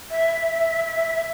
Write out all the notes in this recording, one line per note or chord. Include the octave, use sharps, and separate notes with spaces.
E5